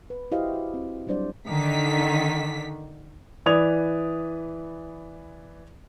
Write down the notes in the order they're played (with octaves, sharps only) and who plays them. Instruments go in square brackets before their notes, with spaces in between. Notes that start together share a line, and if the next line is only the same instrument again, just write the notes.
[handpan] B4
E4 F#4 G4 C5 D#5 F5
F#4
C4
F#3 G3 D4 C5 D5
[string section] D3 D#3 B6
[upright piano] E3 B4 D5 D#6 G#6 F7